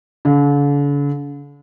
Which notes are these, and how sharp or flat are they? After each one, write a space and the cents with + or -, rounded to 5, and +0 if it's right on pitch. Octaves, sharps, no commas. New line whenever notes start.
D3 -45